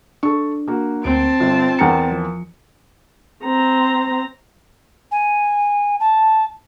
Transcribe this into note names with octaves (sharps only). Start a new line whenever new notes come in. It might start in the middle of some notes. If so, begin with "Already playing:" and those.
D4 A4 C#6
A#3 F#4
D2 C4 A5 D7
G1 F4
E2 A#4 F#5 G5 A#5 C#7
F3
C4 A#5
G#5
A5